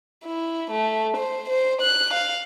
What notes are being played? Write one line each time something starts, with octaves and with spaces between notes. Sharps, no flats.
E4
A3
C5
C5
F#6
F5